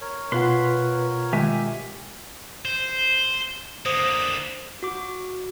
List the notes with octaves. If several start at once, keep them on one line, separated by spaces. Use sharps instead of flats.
A#4 C#5
B2 F4 B4 F#5 C6
D#3 G#3 G4 E5 G#5
C5
D3 A#3 C5 D#6
F#4 D6